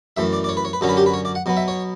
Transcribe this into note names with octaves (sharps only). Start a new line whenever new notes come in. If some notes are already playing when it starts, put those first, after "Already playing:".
F#2 E3 A3 E5
D5
D5
C#5
B4
C#5
B4
F#2 D3 F#3 C#4 A4
B4
G4
B4
C#5
D5
F#5
B2 F#3 B3
E5
C#5